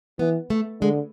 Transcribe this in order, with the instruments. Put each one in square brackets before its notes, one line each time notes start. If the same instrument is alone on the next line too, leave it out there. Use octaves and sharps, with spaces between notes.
[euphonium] E3 [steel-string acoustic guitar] B3
[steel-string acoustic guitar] A3
[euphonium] D3 [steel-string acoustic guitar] G#3